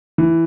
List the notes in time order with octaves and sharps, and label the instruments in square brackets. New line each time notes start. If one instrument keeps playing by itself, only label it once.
[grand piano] E3